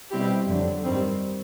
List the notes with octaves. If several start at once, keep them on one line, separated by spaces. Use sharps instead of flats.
B2 G3 C4 E4 G4
F2 D3 F#3
G2 D#3 G3 C4